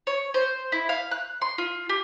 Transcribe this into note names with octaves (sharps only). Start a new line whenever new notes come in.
C#5
C5
E4
F5
F#6
C6
F4
G4